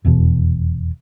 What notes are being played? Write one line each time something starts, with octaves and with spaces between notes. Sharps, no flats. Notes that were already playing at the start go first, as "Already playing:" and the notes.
F1 E2 B2